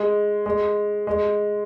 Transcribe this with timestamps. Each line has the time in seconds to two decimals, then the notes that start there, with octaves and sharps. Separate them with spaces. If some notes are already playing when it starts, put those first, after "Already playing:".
Already playing: G#3
0.46 G#3
1.07 G#3